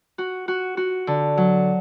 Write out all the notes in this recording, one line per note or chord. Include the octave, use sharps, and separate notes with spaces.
F#4
F#4
F#4
D3
F#3